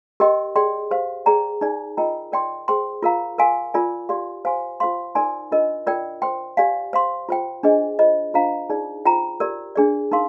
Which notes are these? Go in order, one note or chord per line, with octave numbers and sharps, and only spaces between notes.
G4 A#4 D#5 G5 C6
G#4 D5 G5 C6
G4 C5 F5
G#4 D5 G5 A#5
D#4 G#4 D5 G#5
F4 A#4 D#5 G5 A#5
A#4 D5 G5 C6
G#4 C5 G5 C6
F4 A#4 F5 A#5
A#4 F5 G#5 C6
F4 A#4 D5 G#5
G4 D5 F5 C6
C5 F5 G#5 C6
F4 C5 F5 C6
D#4 A#4 D5 G#5 C6
D4 F4 A#4 D#5
F4 A#4 D5 G5
C5 G5 C6
G4 D5 F5 G#5
C5 F5 C6
F4 C5 G5
D4 G#4 C5 D#5 G#5
F4 C5 D#5
D4 F4 C5 F5 A#5
D#4 G#4 D5
F4 C5 G5 A#5
G4 A#4 D5
D4 G#4 D5
D#4 A#4 F5 C6